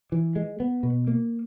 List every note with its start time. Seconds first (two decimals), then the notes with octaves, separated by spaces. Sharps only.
0.12 E3
0.36 G#3
0.60 B3
0.83 B2
1.07 A#3